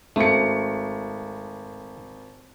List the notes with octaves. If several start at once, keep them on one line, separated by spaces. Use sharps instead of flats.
G#1 A3 C#7